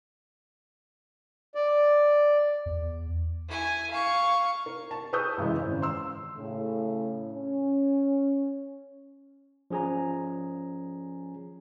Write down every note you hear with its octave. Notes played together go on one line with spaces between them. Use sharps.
D5
E2
E4 G#5
F5 C#6
A#4
A5
G#4 B4 C#6 D#6 E6 G6
F#2 C#3 E3 G#3
G#1 C#3
C6 E6
A2 C#3
C#4
F3 C#4 G#4 G#5 A#5